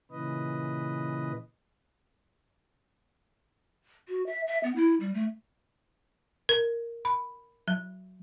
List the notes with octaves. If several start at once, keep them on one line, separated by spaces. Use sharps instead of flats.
A#2 C#3 E3 B4 D#5
F#4
E5
E5
B3
E4
G3
A3
A#4
B5
F#3